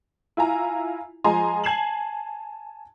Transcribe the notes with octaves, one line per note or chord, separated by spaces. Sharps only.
E4 F4 G#5 A#5
F3 G#3 D#5 G#5 A#5 C6
G#5 A5 G#6 C7 E7 F#7